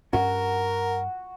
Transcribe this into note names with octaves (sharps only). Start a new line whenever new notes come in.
G2 C#4 F#4 A#4